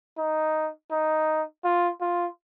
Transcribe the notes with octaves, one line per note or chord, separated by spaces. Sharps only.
D#4
D#4
F4
F4